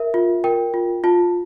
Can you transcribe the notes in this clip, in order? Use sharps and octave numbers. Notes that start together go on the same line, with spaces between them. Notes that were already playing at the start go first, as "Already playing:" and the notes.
Already playing: A#4 E5
F4
A#4 G5
F4
F4 A5